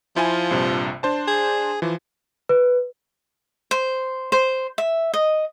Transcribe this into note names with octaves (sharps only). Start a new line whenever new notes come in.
F3 E4 F4 G#5
A#1 G2 C3
D4 C5 A5
G#4
E3 F3
B4
C5
C5
E5
D#5